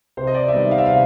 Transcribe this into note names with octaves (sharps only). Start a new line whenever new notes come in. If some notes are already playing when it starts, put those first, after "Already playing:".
C3 C5
D#5
D5
E5
D#3 G3 B3 D#5
F5
E5
C3 F5